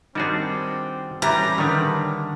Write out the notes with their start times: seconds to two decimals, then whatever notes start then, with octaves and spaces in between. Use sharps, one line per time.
0.15 D#3 G3 C4 D4 F#4 G#4
1.22 E3 G3 C#4 G4 A4 B4 A#5
1.58 D3 D#3 G3 D4